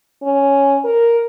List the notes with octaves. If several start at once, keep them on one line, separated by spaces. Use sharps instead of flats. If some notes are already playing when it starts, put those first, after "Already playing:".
C#4
A#4